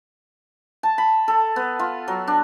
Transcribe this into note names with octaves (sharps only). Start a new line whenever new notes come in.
A5
B5
A4
B3
F4
F#3
D4